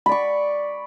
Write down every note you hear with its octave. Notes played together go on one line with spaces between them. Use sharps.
D5 B5 C#6